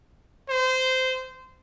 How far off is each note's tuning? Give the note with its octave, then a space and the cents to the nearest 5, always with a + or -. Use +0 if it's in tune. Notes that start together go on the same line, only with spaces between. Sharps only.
C5 -20